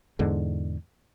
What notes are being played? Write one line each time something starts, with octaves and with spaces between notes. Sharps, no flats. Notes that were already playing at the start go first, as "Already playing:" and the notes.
E2 G#2 D3 G#3